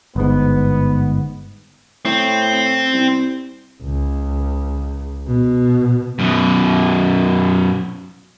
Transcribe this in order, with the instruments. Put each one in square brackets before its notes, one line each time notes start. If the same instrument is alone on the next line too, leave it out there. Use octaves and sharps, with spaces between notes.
[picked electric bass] G1 G#2 [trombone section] B3
[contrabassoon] A2 [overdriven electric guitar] C4
[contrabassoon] C2
[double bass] C#2
B2
[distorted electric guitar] F#2 B2